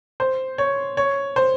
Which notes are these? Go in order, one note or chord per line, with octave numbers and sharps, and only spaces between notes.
C5
C#5
C#5
C5